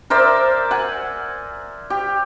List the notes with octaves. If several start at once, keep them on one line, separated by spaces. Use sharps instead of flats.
A#4 C5 D5 E5
F#5 G#5
G4